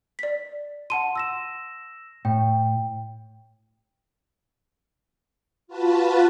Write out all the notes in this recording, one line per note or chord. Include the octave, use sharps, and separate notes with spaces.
D5 B6
F#5 A5 C6 D#7
E6 A#6 E7
A2 G5
F4 F#4 B4 A5